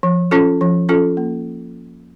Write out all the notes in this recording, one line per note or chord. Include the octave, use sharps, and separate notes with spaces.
F3
C#4 F4 A4
F3
C#4 F4 A4
A#3